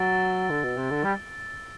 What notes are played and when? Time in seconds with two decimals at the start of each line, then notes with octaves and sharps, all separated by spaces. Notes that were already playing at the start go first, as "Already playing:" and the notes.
Already playing: F#3 E6 A6 D7 G7
0.50 D3
0.63 B2
0.77 C3
0.91 D3
1.04 G3